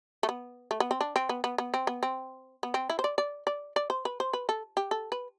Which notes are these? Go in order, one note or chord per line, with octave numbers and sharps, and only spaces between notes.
A3
B3
A3
B3
C4
D4
C4
B3
B3
B3
C4
B3
C4
B3
C4
E4
C5
D5
D5
D5
D5
C5
B4
C5
B4
A4
G4
A4
B4